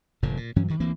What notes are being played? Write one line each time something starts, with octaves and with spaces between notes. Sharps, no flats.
F1 A#2 D3
A#2
G2 E3 F#3 C#4
G2 D#3
D2 E3 A#3 C4